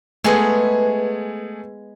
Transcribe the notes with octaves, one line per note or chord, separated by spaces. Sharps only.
G#3 A3 B3 G#4